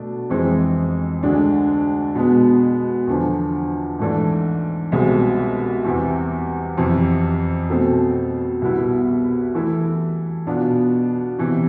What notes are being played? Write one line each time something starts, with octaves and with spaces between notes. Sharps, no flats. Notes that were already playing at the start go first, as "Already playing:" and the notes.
Already playing: B2 A3 D4
F2 E3 G#3 C4 G#4
D2 D3 G#3 D4
B2 G#3 B3
E2 D3 F3
G#2 E3 A3 D4
C2 B2 G#3 C4 G#4
E2 C3 E3
F2 C3 E3
B2 A3 C4
C2 B2 B3 E4
E3 A3 E4 A4
B2 B3 D4 F4
C3 E3 B3